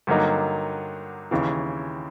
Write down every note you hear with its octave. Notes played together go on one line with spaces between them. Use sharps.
G2 D3 F#3 A#3 D#4
D#2 C#3 E3